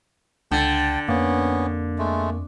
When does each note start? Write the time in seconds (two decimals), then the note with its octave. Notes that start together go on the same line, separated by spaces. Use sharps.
0.51 C#2 D3 G5 A5
1.09 F2 A#3 B3 C#4
1.99 G#3 A3